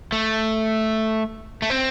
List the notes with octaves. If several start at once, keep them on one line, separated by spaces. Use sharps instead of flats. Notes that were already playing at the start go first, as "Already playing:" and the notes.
A3
A3
C4